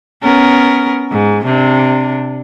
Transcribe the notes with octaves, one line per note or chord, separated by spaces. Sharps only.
B3 C#4 A#4
G#2
C3 D4